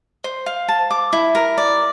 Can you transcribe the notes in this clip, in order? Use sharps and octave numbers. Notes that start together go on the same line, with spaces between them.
C5
F5
A5
D6
E4
A#4
D5